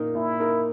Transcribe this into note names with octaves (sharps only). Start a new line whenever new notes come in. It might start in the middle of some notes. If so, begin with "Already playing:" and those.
Already playing: A#2 A#3 D#4 A#4
A#2 E4
A#3 D#4 A#4